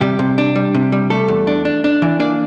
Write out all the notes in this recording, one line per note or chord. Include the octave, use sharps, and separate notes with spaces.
C3 G3 G4
C3
D4
G3
C3
G3
G3 A3 A4
E2
D4
D4
D4
E3
A#3 D4 D5